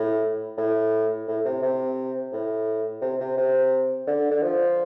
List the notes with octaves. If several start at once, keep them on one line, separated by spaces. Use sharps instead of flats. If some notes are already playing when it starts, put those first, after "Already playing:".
Already playing: A2
A2
A2
C3
C3
A2
C3
C3
C3
D3
D3
F3